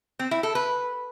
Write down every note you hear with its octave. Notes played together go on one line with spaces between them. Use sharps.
C4
E4
A4
B4